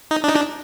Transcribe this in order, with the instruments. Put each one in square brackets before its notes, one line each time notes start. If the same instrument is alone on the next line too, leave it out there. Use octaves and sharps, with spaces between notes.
[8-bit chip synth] D#4
D4
D#4
D4